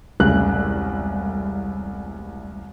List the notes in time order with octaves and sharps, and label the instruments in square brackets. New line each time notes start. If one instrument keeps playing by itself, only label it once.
[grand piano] E1 C2 A2 C#3 F#6